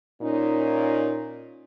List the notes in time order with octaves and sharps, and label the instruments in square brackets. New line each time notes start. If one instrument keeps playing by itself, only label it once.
[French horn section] A#2 C#4 D#4